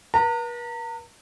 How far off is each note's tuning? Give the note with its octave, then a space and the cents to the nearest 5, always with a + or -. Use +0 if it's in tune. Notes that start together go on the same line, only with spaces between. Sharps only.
B4 -45 A#5 -35